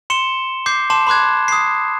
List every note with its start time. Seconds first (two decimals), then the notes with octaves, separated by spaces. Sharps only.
0.10 C6 C#7 E7 G7
0.66 D6 G6 C7
0.90 A5 C6 D6 E7
1.07 B5 C6 D6 F#6 G#6
1.48 D#6 C7